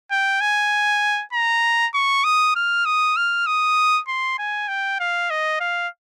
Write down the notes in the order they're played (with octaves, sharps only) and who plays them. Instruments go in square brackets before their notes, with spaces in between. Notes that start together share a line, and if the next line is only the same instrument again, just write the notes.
[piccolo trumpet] G5
G#5
A#5
C#6
D#6
F6
D#6
F6
D#6
C6
G#5
G5
F5
D#5
F5